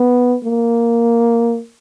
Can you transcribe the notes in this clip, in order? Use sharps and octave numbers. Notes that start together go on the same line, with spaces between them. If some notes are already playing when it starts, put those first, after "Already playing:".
Already playing: B3
A#3